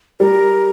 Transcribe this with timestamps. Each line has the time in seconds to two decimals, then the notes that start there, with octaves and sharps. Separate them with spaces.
0.20 G3 A#4